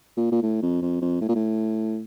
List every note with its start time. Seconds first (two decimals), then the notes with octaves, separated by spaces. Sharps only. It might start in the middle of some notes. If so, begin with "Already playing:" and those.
0.17 A#2
0.32 A#2
0.42 A2
0.62 F2
0.82 F2
1.02 F2
1.21 A2
1.29 A#2
1.35 A2